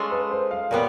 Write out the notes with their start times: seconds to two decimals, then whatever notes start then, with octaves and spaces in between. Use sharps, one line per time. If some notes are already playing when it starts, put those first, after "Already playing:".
Already playing: G#3 C#4 F4 A4
0.11 B4
0.31 C5
0.51 F5
0.71 A#2 G3 B3 C#5